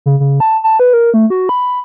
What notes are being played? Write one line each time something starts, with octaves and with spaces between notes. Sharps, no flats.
C#3
C#3
A5
A5
B4
A#4
A3
F#4
B5